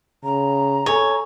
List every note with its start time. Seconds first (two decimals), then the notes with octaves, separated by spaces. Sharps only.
0.24 C#3 A#5
0.86 A4 C#5 G#5